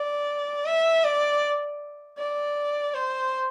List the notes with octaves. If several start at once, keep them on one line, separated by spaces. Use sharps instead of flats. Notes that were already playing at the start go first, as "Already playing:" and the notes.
Already playing: D5
E5
D5
D5
C5